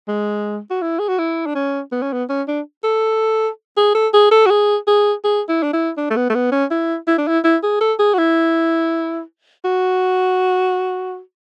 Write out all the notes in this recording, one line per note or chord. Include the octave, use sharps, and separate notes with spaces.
G#3
F#4
E4
G#4
F#4
E4
D4
C#4
B3
C#4
B3
C#4
D4
A4
G#4
A4
G#4
A4
F#4
G#4
G#4
G#4
E4
D4
E4
D4
A3
B3
A3
B3
C#4
E4
E4
D4
E4
E4
G#4
A4
G#4
F#4
E4
F#4